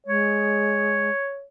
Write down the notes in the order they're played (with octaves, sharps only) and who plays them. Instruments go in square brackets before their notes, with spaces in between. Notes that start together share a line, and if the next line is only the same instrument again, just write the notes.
[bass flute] G#3 [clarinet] C#5